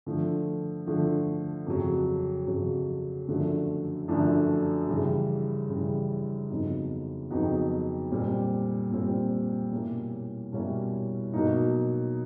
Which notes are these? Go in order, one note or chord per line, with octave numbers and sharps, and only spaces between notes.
D3 F3 A3
D3 F3 A3
F2 C#3 F#3
F2 C#3 F#3
F#2 D3 F3 A3 D4
F#2 D3 F3 A3 D4
C#3 E3 G3
C#3 E3 G3
F2 C#3 F#3 B3 D#4
F2 C#3 F#3 B3 D#4
A#2 G3 C4
A#2 G3 C4
B2 G3 A#3 C#4 E4
B2 G3 A#3 C#4 E4
B2 F#3 A#3 D#4